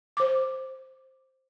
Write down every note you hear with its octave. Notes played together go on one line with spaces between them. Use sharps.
C5 D6